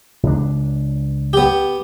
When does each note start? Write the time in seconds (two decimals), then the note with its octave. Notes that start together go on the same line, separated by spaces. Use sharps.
0.23 C#2 D4
1.33 B3 G4